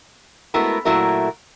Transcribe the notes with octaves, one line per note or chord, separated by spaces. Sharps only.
G#3 A3 B3 E4 F#4 A#4
A#2 F#3 A3 E4 F#4 A#4